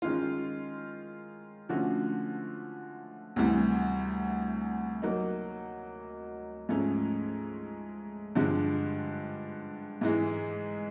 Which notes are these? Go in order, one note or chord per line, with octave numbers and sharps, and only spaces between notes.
D#3 G#3 C#4 F4
D3 F3 A3 C#4 F#4
D2 C3 E3 G3
F#3 A#3 D#4
G#2 F3 A3 C#4
G2 D3 F3 G#3
G#2 E3 G#3